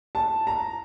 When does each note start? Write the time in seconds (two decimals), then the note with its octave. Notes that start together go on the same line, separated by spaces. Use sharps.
0.15 A5
0.47 A#5